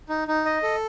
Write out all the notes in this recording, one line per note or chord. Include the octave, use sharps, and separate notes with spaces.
D#4
D#4
D#5
A4